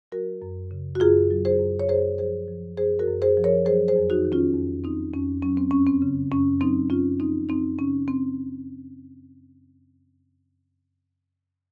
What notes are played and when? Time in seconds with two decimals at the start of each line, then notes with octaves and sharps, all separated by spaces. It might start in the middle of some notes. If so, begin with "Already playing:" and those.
0.12 F#3 F#4 A#4
0.42 F#2
0.71 C#3
0.95 F#4
1.00 F#2 F4 G#4
1.31 F#3
1.45 G#4 C5
1.60 F#2
1.80 C#5
1.89 F#2 G#4 C5
2.18 F3 G#4 C5
2.48 F3
2.77 F#2 G#4 C5
2.99 F#4 A#4
3.08 F#2
3.22 G#4 C5
3.37 F3
3.44 A#4 C#5
3.65 F#3 G#4 C5
3.88 G#4 C5
3.96 F2
4.10 D#4 F#4
4.25 D#3
4.32 C#4 F4
4.54 F2
4.84 F#3 C4 D#4
5.14 F2 C#4
5.42 F#3 C#4
5.57 C4
5.71 F#2 C#4
5.87 C4
6.02 C#3
6.31 F#2 C#4
6.60 F#3 C4 D#4
6.90 F#2 C#4 F4
7.19 F3 C4 D#4
7.49 F#2 C4 D#4
7.79 C#3 C#4
8.08 C4